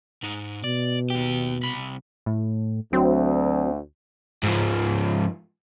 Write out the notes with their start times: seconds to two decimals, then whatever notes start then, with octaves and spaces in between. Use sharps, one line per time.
0.23 G#2 D#4
0.64 B2 D5
1.10 D#2 G4
1.63 C2 B5
2.26 A2
2.93 D2 F#3 C4
4.43 G#2 F3